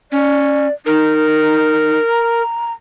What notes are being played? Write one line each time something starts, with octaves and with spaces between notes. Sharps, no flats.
C#4 D5
D#4 A#4
A#5